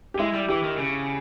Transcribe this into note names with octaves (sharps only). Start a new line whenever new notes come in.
G4
G#3 E4
G3
E3 G4
D#3
C#3